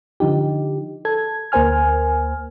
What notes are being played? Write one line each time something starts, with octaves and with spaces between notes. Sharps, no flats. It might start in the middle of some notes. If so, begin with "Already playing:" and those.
D3 F3 D#4 G4
A4 G#6
D2 A#3 A#4 C5 G#5 F6